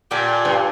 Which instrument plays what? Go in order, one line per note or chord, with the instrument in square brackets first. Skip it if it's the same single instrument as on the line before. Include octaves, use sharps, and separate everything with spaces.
[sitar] A#2 [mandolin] G4 A4
[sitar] G2